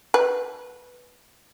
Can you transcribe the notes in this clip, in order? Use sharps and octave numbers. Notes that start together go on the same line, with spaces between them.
B4